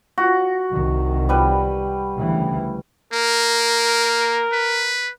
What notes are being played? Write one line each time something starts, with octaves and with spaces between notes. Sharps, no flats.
F#4
C2 D#3
G3 B4
D2 C#3 E3
A#3 A#4
B4